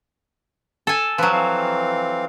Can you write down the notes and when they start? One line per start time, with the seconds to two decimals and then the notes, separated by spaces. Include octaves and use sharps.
0.87 A4 G#5
1.18 F3 F#3 B4
1.32 E3 C4 F5